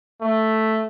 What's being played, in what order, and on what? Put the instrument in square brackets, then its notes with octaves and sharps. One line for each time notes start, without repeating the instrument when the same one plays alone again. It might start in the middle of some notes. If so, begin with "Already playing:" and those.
[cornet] A3